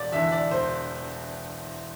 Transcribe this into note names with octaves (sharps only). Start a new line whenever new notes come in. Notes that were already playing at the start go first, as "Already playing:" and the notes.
Already playing: E1 D5
E2 D3 E5
D5
E1 C5